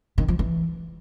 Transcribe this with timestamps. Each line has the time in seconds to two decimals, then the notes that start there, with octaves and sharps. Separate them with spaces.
0.18 D#3
0.28 F3
0.39 E3